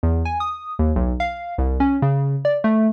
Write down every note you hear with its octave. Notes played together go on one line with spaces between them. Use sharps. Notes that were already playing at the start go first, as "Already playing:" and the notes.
E2
G#5
D#6
D#2
B1
F5
C2
C#4
C#3
D5
A3